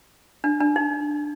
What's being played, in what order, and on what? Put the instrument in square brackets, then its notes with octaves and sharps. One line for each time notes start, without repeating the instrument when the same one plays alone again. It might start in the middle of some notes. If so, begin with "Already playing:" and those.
[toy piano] D4
D4
D#4